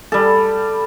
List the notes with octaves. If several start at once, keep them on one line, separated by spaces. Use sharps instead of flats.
G3 A4